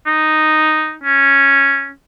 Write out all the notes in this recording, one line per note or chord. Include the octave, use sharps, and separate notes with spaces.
D#4
C#4